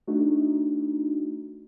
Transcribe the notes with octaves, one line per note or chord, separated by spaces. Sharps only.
A3 D4 D#4 F#4